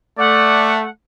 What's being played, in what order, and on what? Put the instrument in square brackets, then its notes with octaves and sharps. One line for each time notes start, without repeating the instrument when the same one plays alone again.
[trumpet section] A3 [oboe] D5 [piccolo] F#5